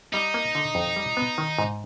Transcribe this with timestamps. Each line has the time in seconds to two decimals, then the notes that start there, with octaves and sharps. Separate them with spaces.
0.13 G3 D#4
0.34 A#3
0.55 D3
0.75 F2
0.96 G3
1.17 B3
1.38 D#3
1.59 G#2